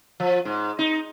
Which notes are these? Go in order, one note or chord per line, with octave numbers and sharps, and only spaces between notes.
F3
G#2
D#4